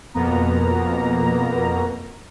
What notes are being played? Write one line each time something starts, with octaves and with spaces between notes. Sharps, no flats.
F2 B2 A#3 B3 A#5